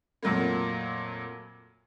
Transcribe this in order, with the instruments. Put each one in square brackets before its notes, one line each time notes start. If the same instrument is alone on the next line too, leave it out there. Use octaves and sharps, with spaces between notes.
[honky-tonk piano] F2 A#2 F#3 A3 A#3